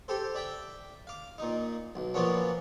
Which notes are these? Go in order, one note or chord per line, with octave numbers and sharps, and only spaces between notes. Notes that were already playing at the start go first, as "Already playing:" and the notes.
G4 A4 C5
D5 E5 G5
F5 D6
A#2 D#4
B1
A#2 F3 A#3 B3 C#4 D4